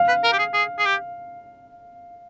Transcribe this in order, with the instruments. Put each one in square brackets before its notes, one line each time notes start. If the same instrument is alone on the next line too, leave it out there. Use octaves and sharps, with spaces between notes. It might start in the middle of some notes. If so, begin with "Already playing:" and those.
Already playing: [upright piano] F5
[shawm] B4
A#4
G4
G#4
G#4
G#4
G4